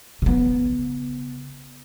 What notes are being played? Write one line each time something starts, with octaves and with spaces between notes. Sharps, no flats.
C#3 B3